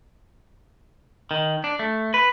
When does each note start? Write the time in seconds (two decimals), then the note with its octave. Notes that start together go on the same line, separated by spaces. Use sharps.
1.31 D#3
1.64 D4
1.79 A3
2.14 B4